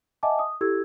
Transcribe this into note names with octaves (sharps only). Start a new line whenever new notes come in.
D#5 E5 F#5 G#5 A5 D6
D#6
E4 G4 A4 E6 G#6